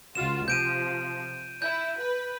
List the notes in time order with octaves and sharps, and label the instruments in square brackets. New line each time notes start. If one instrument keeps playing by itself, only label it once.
[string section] C#2 F4 F#4 [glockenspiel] E7
[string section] C3 F3 [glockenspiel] G6 D7 D#7
[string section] E4 [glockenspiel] G6
[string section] B4